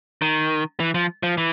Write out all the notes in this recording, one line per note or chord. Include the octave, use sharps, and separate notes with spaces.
D#3
E3
F3
F3
E3